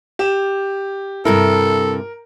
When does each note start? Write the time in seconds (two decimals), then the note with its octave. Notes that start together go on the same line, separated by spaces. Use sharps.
0.19 G4 E7
1.25 G2 C3 E4 A4 A#4